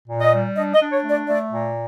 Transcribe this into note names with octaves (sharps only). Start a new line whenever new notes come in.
A#2
D#5
G3
D4 D#5
D#5
D4
C#5
A3 D5
A3 D5
A#2